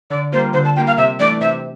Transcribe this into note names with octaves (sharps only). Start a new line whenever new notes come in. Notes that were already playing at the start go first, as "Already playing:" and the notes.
D3 D5
G3 A#3 F4 C5
D3 C5
A5
G3 A#3 F4 G5
F5
C3 E5
E3 A3 D4 D5
C3 E5